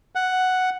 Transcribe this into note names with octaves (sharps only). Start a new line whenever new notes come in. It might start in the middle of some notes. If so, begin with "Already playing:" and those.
F#5